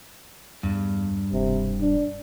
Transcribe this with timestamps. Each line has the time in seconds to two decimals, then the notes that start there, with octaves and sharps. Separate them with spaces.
0.63 E2 G2
1.32 E1 C3
1.81 D4